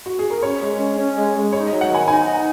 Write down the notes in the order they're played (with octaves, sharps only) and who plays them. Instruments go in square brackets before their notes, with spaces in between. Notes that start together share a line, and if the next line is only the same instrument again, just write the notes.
[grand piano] F#4
G#4
A#4
[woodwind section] C#4 [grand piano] C#5
[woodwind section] G#3
C#4
C#4
G#3
G#3
[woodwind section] D#4 [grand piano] C#5
[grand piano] D#5
[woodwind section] F#3
[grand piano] F#5
[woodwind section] D#3 [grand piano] G#5
[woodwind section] D#4 [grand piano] G#5
[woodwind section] D#4